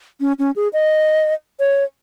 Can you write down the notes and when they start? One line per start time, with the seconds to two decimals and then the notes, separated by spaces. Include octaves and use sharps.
0.20 C#4
0.39 C#4
0.56 G#4
0.73 D#5
1.60 C#5